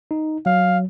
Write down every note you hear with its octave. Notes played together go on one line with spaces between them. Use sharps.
D#4
F#3 F5